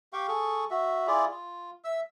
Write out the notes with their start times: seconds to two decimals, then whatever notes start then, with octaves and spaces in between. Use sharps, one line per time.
0.13 G4 F5 G5 C#6
0.28 G#4 A4 C#6 D#6
0.71 F#4 E5
1.07 E4 F4 G#4 D5
1.31 F4
1.84 E5 E6